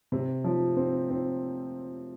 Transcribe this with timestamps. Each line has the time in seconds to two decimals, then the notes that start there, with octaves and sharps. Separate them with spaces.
0.12 C3
0.44 F3
0.77 C4
1.10 C4